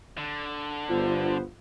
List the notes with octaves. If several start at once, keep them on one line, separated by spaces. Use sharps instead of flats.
D3
G1 B3 F4 C5